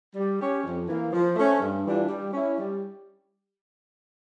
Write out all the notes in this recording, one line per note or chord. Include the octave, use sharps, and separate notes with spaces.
G3
C#4 G4 C#5
F2
E3 A#3
F3
A3 C#4
G2
E3 G3 D4 F4
G3
C#4 E4
G3